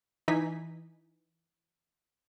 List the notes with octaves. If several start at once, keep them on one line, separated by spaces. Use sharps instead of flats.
E3 D#4 G#5 B6